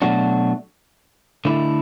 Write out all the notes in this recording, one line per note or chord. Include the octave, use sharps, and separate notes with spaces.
B2 F#3 A3 D4 F#4
D3 A3 E4